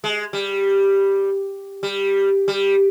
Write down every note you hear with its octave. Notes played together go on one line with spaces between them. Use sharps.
G#3
G3
G3
G3